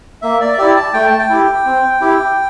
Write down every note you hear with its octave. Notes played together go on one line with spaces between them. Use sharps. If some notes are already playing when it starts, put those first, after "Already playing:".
A#3 E5
D5
E5
E4 G4 D5
A5
A3 G5
A5
G5
E4 G4
C4
E4 G4